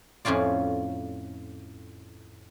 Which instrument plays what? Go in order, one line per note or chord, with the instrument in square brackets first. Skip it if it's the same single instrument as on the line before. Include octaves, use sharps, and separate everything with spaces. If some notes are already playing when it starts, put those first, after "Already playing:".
[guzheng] F2 A2 C#4 F4 D5